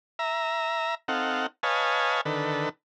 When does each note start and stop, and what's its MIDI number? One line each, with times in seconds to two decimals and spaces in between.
0.19 0.95 76
0.19 0.95 82
1.08 1.46 60
1.08 1.46 63
1.08 1.46 69
1.08 1.46 77
1.08 1.46 78
1.63 2.21 71
1.63 2.21 73
1.63 2.21 75
1.63 2.21 77
1.63 2.21 80
1.63 2.21 81
2.25 2.69 50
2.25 2.69 51
2.25 2.69 69
2.25 2.69 71